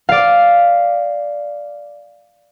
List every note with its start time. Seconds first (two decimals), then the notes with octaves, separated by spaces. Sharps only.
0.09 D5 F5